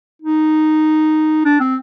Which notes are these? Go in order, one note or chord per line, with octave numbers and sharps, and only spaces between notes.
D#4
D4
C4